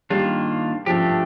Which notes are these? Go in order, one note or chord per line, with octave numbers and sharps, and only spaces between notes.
D#3 G3 A#3 D4 F4
F3 A3 D4 G4